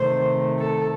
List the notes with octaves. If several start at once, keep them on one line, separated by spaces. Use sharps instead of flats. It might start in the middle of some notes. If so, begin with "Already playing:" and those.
Already playing: C3 D#3 A3 C5
A4